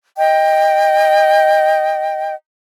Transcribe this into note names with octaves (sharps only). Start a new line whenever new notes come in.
D#5 G5